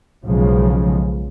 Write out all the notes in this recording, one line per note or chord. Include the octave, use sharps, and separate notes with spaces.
B1 C#3 F3 G#3